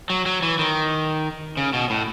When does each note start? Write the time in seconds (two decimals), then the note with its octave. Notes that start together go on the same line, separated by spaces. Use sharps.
0.10 F#3
0.26 F#3
0.42 E3
0.59 D#3
1.57 C#3
1.73 B2
1.90 A2